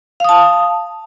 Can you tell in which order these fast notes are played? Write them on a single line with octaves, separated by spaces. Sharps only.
F5 D#6 A5